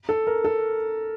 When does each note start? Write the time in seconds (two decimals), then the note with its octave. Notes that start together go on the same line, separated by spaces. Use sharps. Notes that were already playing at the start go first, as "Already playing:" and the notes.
0.09 A4
0.27 A#4
0.45 A4